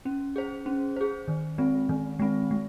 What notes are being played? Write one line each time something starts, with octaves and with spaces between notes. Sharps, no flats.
C#4
G#4 C5
C#4
G#4 C5
D#3
G#3 C4
D#3
G#3 C4
G#3